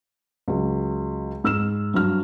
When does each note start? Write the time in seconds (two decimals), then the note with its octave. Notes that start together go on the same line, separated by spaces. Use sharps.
0.48 C#2 F#3
1.44 G#2 E6 F6 E7
1.94 G2 F#3 F6